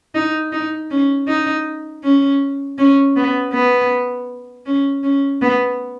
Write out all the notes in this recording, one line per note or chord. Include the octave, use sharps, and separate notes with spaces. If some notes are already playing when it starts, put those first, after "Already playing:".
D#4
D#4
C#4
D#4
C#4
C#4
B3
B3
C#4
C#4
B3